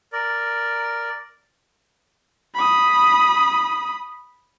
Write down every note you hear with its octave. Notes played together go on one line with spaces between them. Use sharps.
A#4 D5
B5 D#6